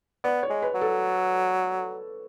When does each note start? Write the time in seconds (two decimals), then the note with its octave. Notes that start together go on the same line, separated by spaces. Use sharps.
0.24 B3 D5
0.43 C#5
0.50 G#3
0.62 B4
0.75 F#3
0.81 A4